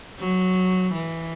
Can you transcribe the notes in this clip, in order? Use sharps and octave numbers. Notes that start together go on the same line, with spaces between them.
F#3
E3